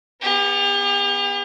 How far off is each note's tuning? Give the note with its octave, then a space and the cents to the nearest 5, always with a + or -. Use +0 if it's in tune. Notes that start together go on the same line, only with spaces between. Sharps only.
B3 -5 G4 +45